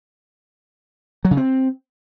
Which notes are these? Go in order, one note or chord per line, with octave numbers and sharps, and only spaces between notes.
F#3
C#3
C4